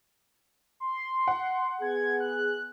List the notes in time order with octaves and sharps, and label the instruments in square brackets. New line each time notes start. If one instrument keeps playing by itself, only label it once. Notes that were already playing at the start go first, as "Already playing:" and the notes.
[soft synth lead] C6
[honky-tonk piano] F#5
[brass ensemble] B3 G#4 [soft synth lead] G#6
[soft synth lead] F#6